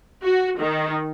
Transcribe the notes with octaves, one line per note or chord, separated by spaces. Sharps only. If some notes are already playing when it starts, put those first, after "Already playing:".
F#4
D#3